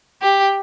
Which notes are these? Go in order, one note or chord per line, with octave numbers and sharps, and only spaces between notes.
G4